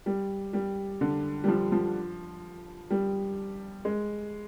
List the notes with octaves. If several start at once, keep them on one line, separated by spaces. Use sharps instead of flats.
G3
G3
D3
G3
F3
F3
G3
G#3